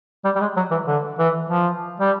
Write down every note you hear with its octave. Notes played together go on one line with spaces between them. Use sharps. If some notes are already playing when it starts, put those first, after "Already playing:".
G3
G3
G#3
F#3
E3
D3
E3
F3
G3